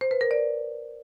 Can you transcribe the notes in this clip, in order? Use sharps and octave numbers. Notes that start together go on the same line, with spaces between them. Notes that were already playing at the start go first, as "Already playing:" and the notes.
C5
B4
A#4
D5